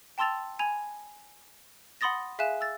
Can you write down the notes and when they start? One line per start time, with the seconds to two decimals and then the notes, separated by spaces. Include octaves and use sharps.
0.18 G5 A5 C6 E6 A6 F7
0.59 G#5 B5 G#6 F7
2.01 F#5 B5 C6 D#6 A6 A#6
2.39 G#4 E5 F5 G#5 F#6 E7
2.61 E6 A6